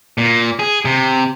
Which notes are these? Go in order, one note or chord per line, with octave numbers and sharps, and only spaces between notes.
A#2
G#4
C3